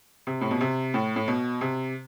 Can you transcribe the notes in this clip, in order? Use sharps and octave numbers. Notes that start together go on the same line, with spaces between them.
C3
A2
B2
C3
A2
A2
B2
C3